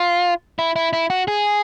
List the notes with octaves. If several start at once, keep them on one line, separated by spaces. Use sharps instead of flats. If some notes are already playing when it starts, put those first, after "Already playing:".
Already playing: F4
E4
E4
E4
F#4
G#4